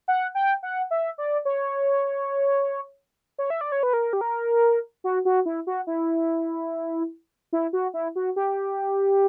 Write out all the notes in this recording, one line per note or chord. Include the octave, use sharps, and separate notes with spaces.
F#5
G5
F#5
E5
D5
C#5
C#5
E5
D5
C#5
B4
A#4
G4
A#4
F#4
F#4
E4
F#4
E4
E4
F#4
E4
F#4
G4